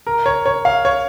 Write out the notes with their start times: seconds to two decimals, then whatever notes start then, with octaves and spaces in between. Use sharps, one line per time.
0.07 A#4
0.26 C#5
0.46 C#5
0.65 F5
0.85 C#5